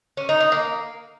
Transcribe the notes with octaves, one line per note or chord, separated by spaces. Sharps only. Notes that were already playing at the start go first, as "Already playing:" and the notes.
C#4
D#4
D#4
A#3